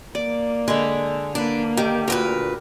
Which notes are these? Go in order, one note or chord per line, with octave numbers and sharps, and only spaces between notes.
A#3 D5
D3 G#3 B5
A#3 D4 B4 D5
D#3 G4
D2 A#2 A#4 B4